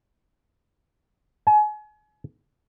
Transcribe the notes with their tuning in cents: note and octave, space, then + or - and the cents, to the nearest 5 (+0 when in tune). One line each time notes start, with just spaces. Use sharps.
G#5 +35